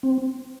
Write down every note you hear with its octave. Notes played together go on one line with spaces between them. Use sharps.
C4